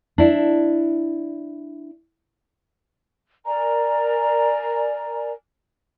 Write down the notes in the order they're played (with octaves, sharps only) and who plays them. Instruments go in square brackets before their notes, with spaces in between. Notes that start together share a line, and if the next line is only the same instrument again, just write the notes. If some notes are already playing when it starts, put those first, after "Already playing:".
[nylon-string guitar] D4 E4
[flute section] A#4 D5 G#5 A#5